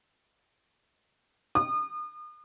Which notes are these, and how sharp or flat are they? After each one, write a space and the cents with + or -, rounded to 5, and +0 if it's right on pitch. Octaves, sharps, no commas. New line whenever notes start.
D#6 -35